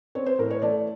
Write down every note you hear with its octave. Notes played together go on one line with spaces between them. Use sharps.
C4 C#5
C5
A2 A#4
C#5
A3 D5